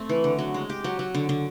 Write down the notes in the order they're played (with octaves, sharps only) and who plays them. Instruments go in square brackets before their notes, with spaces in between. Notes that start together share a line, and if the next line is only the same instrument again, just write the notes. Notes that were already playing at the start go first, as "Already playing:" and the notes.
Already playing: [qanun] A3 C4
E3
D3
F#3
G#3
G4
F#3
F#3
D3
D3